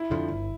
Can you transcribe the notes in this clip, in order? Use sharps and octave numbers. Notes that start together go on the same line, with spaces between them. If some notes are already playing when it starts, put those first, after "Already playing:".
Already playing: E4
F2 D3 F3
G1